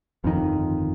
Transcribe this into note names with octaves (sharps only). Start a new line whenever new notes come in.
G1 F2 C3 D#3